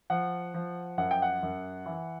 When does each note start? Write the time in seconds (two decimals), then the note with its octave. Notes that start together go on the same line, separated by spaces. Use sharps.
0.10 F3 F#5
0.54 F3
0.98 F#2 F#5
1.11 G5
1.22 F#5
1.43 F#2
1.86 E3